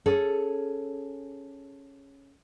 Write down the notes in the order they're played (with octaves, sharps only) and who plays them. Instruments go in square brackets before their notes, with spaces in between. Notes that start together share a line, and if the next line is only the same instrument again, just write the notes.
[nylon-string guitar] C#4 G#4 A4